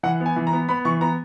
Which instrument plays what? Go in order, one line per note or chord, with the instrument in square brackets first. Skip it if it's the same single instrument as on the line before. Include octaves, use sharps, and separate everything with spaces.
[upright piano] E3 F#5
B3
G#5
E3
A#5
B3
B3 B5
E3 C#6
B3 A#5